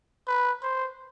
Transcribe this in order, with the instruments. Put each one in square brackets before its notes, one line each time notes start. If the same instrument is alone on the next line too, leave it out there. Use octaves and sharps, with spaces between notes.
[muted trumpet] B4
C5